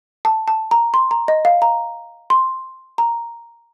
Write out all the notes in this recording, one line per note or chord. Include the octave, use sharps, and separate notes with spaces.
A5
A5
A#5
C6
A#5
D#5
F5
A#5
C6
A#5